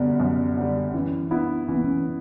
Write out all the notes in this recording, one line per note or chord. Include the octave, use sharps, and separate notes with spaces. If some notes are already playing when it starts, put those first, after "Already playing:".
Already playing: F#2 D3 G3 B3
F#2
D3 G3
E3 C#4
B3 D4 E4
E3 C#4
B3
C#4